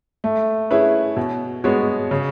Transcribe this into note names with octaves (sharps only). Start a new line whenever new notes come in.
A3
C#4 E4 G#4 B4
B2
G#3 B3 F#4 C#5
C#3